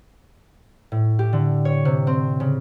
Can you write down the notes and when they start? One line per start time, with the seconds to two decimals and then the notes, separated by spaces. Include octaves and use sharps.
0.92 A2
1.19 G4
1.33 D3
1.65 C#5
1.85 C3
2.07 C4
2.40 C#3